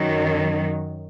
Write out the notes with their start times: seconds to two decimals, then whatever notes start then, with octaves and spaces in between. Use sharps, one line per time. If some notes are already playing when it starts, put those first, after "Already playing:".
Already playing: F#2 D#3 F#3